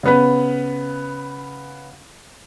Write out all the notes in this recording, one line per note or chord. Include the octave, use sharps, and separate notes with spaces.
C#3 B3 B4